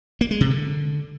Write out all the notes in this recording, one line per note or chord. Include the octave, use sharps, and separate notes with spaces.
A#3
G#3
C3
D3